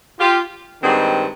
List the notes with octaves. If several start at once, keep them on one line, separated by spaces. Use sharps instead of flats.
F4 G4
G2 D#3 G#3 C4 F#4 G#4